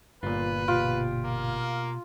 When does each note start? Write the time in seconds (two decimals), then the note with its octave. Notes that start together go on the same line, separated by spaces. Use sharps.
0.23 G1 A#2 F4 B4
0.68 B2 F4 G4
1.24 A#3